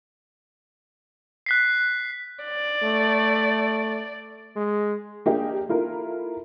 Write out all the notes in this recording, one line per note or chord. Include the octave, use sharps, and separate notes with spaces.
F#6 B6 C7
D5
A3
G#3
A#3 D4 G4 G#4 D#5
A#3 E4 F4 A4 A#4